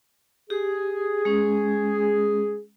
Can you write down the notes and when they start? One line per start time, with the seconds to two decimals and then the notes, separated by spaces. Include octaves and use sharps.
0.50 G4 G#4
1.25 G#3 C#4